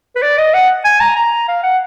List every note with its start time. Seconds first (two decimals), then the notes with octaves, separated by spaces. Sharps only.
0.16 B4
0.23 D5
0.38 D#5
0.54 F#5
0.85 G#5
1.00 A#5
1.16 A#5
1.48 F5
1.63 F#5